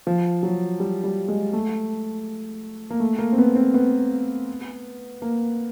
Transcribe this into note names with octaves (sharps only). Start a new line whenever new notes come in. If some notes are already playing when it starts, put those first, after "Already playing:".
F3
F#3
G3
G3
G#3
A3
A#3
A3
A#3
C4
B3
C4
B3
A#3